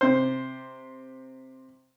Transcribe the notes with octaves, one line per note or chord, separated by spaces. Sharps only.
C3 C5